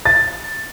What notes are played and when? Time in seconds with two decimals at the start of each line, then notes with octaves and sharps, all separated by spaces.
0.05 A6